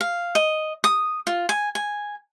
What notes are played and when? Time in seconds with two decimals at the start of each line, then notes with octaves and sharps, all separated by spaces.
0.01 F5
0.35 D#5
0.84 D#6
1.27 F4
1.49 G#5
1.75 G#5